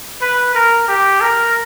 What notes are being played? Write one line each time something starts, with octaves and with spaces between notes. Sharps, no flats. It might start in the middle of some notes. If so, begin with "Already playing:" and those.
B4
A#4
G4
A#4